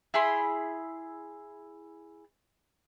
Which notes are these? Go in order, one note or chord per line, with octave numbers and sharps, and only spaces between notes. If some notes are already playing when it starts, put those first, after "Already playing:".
E4 G#4 B5 C6